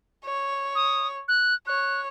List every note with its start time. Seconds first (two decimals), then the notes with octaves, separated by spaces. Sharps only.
0.24 C#5
0.75 D#6
1.28 F#6
1.67 C#5 F#6